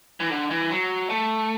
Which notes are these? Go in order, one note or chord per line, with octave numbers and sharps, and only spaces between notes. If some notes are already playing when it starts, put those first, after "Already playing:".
E3
D3
E3
F#3
A3